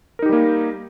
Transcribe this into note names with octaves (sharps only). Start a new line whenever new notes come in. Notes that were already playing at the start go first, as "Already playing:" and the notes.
G3 A#3 D#4 G4 A#4